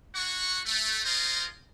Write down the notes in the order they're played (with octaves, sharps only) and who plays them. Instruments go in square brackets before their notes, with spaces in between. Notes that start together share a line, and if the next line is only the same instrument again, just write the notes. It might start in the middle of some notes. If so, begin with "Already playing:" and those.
[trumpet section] D4 F#4 C#5 F#5 C#6
A3
D#4 F4 G#4 A#4 C5 D#5